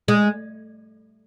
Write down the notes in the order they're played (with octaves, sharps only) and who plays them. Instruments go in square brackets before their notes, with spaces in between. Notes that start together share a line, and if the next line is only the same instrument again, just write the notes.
[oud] G#3